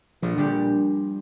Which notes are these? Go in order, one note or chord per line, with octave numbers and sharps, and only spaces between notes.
A#1 F3
A#2 D3 G3 D4 G4